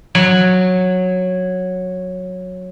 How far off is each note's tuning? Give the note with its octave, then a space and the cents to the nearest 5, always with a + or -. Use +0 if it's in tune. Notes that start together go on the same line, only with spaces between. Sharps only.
F#3 -10